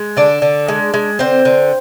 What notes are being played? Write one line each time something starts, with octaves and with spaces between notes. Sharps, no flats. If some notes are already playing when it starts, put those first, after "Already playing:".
Already playing: G#3
D3 D4 D5
D3
G#3
G#3
D3 C4 C5
D3